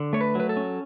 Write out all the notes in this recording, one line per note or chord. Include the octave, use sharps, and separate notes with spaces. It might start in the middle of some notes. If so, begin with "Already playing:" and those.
Already playing: D3
A3 C#5
B4
F#3 B4
A4
C#4